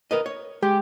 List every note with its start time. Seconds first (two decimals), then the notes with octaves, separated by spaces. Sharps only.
0.11 A#4 B4 D#5
0.26 C#5
0.62 G#3 G4